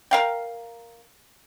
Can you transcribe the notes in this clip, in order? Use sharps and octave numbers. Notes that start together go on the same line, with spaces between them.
A#4 F5 G5